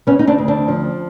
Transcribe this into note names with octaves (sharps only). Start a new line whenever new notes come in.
C#3 B3 C#4
D#4
C4 D4
D2
C4 D4
F3